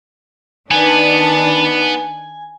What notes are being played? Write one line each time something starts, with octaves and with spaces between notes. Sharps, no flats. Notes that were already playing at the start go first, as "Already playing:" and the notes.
D#3 B3 D4 D#4 B4 G#5 A6